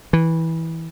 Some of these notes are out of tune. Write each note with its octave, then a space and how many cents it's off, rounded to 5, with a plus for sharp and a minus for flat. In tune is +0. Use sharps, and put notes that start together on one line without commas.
E3 -15